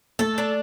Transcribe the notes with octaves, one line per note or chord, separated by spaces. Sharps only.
A3 A4
D4